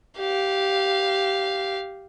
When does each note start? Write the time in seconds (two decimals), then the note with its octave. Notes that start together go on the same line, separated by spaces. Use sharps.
0.18 G4 F5